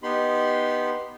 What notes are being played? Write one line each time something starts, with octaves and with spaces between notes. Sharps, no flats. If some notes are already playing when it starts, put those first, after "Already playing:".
B3 D#4 G4 B5 C6